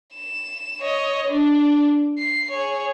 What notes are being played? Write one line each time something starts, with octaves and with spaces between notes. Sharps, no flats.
E7
C#5 D#5
D4
C7
G#4 C#5